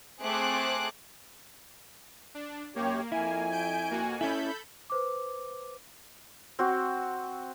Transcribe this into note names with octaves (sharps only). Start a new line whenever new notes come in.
A3 C4 G#4 C5 D6 F#6
D4
F#2 A#3 G4 C#5
F2 E4 G#5
G6 D7
A#3 F#4
C#4 E4 A4 B5 G6
B4 C5 D6
C4 F#4